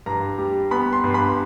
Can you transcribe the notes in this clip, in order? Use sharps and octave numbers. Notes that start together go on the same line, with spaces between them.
G2 A#5
G3
B3 B5
C6
G2
B5